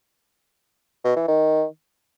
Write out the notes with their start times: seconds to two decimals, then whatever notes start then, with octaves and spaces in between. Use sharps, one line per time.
1.05 B2
1.16 E3
1.28 D#3